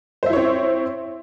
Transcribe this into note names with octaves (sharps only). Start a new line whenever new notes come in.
C4 E4 C5 C#5 E5